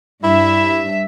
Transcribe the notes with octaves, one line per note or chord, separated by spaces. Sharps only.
G2 E4 E5